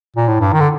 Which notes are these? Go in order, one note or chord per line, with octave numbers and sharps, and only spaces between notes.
A#2
A2
G2
D#3
D3